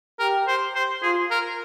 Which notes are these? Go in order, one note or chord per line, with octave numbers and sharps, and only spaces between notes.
G4 A#4
C5
C5
F4 G#4
A#4